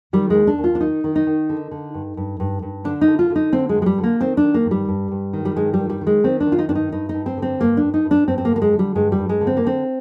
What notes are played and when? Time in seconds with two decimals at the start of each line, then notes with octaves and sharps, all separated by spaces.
0.13 D#3 G3
0.30 G#3
0.35 D#2
0.47 D4
0.58 D#2
0.64 F4
0.75 D4
0.80 D#3 D#4
1.04 D#3
1.16 D#4
1.27 D#3
1.49 D3
1.71 D3
1.94 G2
2.17 G2
2.40 G2
2.62 G2
2.84 D3 D4
3.01 D#4
3.08 D3
3.19 F4
3.30 D3
3.36 D#4
3.53 D3 C4
3.69 G#3
3.75 G2
3.82 G#3
3.86 G3
3.98 D3
4.04 A#3
4.20 D#3 C4
4.37 D4
4.43 D#3
4.54 A#3
4.65 G2
4.71 G3
4.88 G2
5.11 G2
5.33 D#3
5.45 G3
5.56 G2 G#3
5.74 G3
5.79 D#3
5.90 G3
6.01 D#3
6.07 G#3
6.24 D#3 C4
6.40 D4
6.47 D#3
6.52 F4
6.59 D#4
6.69 G2 D4
6.75 D#4
6.92 G2 D#4
7.09 D#4
7.14 G2
7.26 C4
7.37 D3
7.42 C4
7.60 G2 A#3
7.77 G2 D4
7.94 D#4
8.05 G2
8.11 D4
8.28 G2 C4
8.38 C4
8.45 A#3
8.51 D3
8.56 A#3
8.62 G#3
8.73 D3
8.79 G3
8.95 G2 G#3
9.12 G3
9.19 G2
9.29 G#3
9.41 D3
9.47 C4
9.57 A#3
9.64 D3 C4